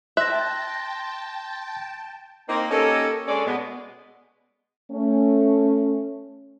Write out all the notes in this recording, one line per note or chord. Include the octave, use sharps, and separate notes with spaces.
E5 G5 A5 C6 F#6 A#6
A#3 C4 D#4
A#3 C#4 D#4 G4 A4
G#3 C#4 D4 A4 C#5 D5
B2 G#3 B3
A3 C#4